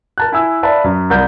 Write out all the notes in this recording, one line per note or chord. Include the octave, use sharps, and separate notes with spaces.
A#4 A5 F#6
E4 G#5 E6
B4 D5 E5 F5 A5 B5
F#2
C2 A#4 G6